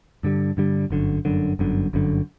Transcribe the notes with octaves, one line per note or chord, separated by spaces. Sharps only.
G2 D3 G3
G2 D3 G3
G1 F#2 D3
G1 F#2 D3
G1 F#2 D3
G1 F#2 D3